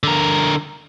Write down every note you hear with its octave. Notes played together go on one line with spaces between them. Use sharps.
D3 A#4